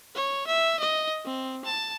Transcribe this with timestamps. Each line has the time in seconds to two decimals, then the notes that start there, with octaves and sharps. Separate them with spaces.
0.15 C#5
0.47 E5
0.80 D#5
1.25 C4
1.64 A5